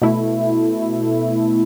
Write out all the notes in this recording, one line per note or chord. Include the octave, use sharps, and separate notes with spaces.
B2 A3 E4